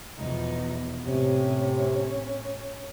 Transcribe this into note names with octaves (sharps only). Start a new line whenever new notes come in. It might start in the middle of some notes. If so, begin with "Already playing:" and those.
E2 B2 F3 D#4
A2 C3 C#4